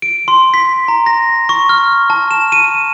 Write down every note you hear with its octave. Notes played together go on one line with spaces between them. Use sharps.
D7
C6
B6
A#5
A#6
C#6
F6
A5
E7
D#7